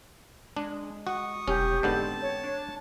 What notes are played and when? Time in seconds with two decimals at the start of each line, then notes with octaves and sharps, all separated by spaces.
0.57 G#3 D4
1.07 F#4 C#6 D#6
1.48 E1 C2 C#4 G4
1.83 G#2 D3 B3 C4 A5
2.22 C#5
2.43 D4